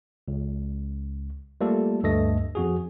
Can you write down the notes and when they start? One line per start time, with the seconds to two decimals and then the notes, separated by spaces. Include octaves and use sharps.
0.28 C#2
1.61 G3 A3 A#3 F4 A4
2.03 D2 G2 A3 A4 D#5 A#6
2.55 F2 F#4 G#4